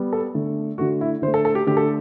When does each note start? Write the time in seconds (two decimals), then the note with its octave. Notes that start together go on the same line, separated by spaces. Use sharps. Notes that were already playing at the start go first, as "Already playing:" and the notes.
Already playing: G3 B3
0.13 A4
0.35 D3 A3
0.78 D3 A3 F#4
1.01 E4
1.22 D3 C5
1.27 A3
1.34 A4
1.45 A4
1.55 G4
1.66 D3 A3 G4
1.77 A4